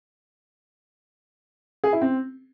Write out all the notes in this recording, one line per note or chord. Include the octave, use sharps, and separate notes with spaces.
G#4
E4
C4